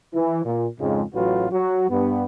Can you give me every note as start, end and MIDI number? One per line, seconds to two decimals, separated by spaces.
0.14 0.41 52
0.44 0.65 46
0.79 1.02 41
0.79 1.02 44
0.79 1.02 49
0.79 1.02 53
0.79 1.02 56
1.14 1.46 33
1.14 1.46 45
1.14 1.46 54
1.14 1.46 65
1.14 1.46 66
1.14 1.46 71
1.52 1.89 54
1.52 1.89 66
1.89 2.24 43
1.89 2.24 59